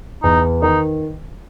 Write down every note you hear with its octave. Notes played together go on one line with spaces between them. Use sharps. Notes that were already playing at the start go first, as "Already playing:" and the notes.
E2 D#4
D#3 D#4